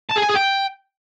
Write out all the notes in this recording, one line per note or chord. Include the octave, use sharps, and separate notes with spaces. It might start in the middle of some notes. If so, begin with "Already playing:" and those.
A5
G#4
G#5
G#4
G5